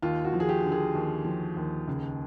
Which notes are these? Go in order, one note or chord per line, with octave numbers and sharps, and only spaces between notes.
D#2 F4
F#4
F3
G#4
G4
D3
G#4
D#2
F3
D#2
C#2